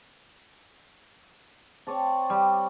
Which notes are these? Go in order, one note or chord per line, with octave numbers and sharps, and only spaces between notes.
C4 C#5 D5 A5
G3